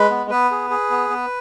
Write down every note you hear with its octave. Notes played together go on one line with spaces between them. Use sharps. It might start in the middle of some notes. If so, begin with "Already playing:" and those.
Already playing: G#3 B4
B3
B3 B4
G#4
G#4
B3
B3